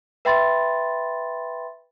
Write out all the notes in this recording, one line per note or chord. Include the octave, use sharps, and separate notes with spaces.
B4 E5 G5 B5 C6 A6